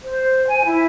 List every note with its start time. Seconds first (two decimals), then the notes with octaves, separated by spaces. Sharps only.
0.04 C5
0.48 G#5
0.65 E4